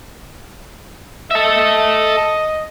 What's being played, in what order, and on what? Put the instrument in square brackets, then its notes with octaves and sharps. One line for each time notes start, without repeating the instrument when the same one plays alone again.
[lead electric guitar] A4 E5 [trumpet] D#5